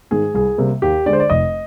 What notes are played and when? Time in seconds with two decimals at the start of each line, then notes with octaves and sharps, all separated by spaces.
0.11 G#2 D#3 G#3 G#4
0.34 C2 G#4
0.58 C3 G3 A#3
0.82 D#2 G4
1.06 D3 G#3 D5
1.13 C5
1.20 D5
1.30 F1 D#5